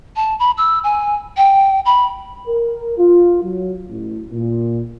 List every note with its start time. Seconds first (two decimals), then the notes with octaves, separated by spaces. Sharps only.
0.16 A5
0.39 B5
0.57 E6
0.84 G#5
1.37 G5
1.85 B5
2.47 A#4
2.98 F4
3.43 F#3
3.90 A1
4.32 A#2